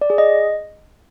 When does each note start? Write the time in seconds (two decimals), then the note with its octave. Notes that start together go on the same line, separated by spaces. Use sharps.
0.01 D5
0.10 G#4
0.18 D#5